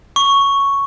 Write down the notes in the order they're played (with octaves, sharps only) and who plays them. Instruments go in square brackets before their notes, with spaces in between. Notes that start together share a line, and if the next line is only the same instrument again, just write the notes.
[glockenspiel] C#6